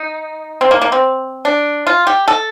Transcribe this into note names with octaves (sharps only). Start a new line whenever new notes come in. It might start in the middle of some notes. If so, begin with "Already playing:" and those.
Already playing: D#4
C4
A#3
A#3
C4
D4
F4
G4
A4